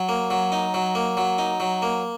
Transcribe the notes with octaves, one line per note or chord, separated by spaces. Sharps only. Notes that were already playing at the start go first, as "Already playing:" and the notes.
Already playing: F#3
A#3
F#3
D#4
F#3
A#3
F#3
D#4
F#3
A#3